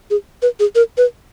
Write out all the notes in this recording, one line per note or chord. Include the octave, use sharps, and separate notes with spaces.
G#4
B4
G#4
A#4
B4